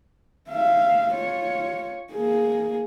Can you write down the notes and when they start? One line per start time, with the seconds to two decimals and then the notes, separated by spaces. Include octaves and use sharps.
0.50 E5 F5
1.13 F4 C#5
2.12 A#3 G#4